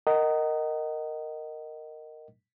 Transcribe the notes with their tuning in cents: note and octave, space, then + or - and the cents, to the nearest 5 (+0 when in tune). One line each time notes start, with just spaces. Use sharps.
A#4 -10 D#5 +0 F#5 +35